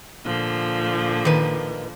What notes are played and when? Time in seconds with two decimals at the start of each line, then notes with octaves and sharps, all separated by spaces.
0.25 A#2 D3 F3
1.25 D#3 B4